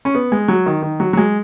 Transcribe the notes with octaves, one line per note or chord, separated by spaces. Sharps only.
C#4
B3
G#3
F#3
D#3
D#3
F#3
F#3
G#3